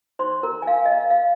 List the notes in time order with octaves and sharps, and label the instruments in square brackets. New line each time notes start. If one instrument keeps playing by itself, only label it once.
[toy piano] D#4 C5 C6
A#4 A#5
G#5
F5
D#5
F5
F5